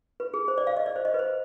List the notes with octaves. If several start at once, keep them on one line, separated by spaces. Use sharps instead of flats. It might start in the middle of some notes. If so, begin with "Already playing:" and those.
B4
G#4
C5
D5
F5
D#5
D5
C5
D#5
B4
C5